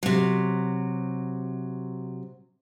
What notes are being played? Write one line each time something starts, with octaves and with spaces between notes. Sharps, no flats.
C3 F#3